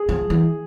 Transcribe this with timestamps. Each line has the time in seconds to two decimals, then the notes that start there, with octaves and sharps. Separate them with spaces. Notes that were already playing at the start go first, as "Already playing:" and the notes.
Already playing: G#4
0.09 F3
0.30 E3